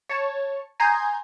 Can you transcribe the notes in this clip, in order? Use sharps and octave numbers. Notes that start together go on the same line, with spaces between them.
C#5 A5
G#5 A#5 C6 D#6 G6 G#6